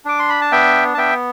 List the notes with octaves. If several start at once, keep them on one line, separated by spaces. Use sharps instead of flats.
D4 D6
C6
B5
A5
B3 E5 G5
A5
B3 E5 G5